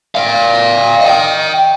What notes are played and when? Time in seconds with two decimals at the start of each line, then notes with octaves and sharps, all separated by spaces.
0.15 D5 F5
1.01 D#5 G5